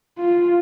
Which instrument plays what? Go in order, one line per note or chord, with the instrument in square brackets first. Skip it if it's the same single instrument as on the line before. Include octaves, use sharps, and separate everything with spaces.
[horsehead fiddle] F4